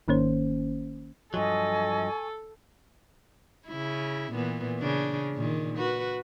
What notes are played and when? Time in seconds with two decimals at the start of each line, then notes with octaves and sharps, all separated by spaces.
0.08 G#1 D#3 A#3 C#4 C5
1.34 G2 F3 F#3 A4 D#5 G#5 C#6
3.68 C#3 E4
4.33 A#2 E3 B3
4.79 C#3 D4
5.35 A#2 D#3
5.78 F#4 B4